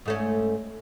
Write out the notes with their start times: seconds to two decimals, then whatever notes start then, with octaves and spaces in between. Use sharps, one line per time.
0.06 G#2 A3 C#4